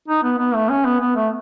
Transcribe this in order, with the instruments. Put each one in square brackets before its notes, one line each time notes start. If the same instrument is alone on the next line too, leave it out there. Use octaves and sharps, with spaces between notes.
[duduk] D#4
B3
B3
A3
C#4
B3
B3
A3